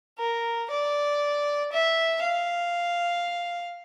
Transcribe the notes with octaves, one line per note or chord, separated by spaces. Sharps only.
A#4
D5
E5
F5